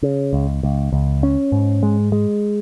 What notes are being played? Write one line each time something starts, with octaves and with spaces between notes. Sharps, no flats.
C#3
C#2
C#2
C#2
C#4
G#2
G#3
G#3